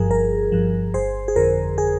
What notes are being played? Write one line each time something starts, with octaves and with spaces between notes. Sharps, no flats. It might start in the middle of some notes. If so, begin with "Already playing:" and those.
Already playing: G1 G2 F3 G#4 A#4
G1 A#4
G2 F3
G1 G#4 C5
G#4
F2 D3 A#4
G#4